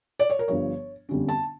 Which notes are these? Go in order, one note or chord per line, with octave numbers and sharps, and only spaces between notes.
D5
C#5
A#4
G1 G2 F3 C#5
G1 F2 D3 G3 C#4
A5